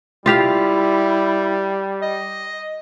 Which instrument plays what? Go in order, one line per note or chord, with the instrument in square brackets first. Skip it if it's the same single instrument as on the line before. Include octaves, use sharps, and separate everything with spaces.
[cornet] G3 [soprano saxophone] E4 [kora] F4 G4 F5
[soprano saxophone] D#5